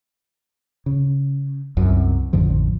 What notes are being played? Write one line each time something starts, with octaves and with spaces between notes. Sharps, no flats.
C#3
C2 F#2 C3
A1 F2 D3 F3